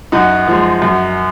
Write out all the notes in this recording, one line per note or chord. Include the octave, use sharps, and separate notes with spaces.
F#2 D#4 F#4
F3 G#3
F#2